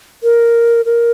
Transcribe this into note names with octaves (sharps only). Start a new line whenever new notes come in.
A#4
A#4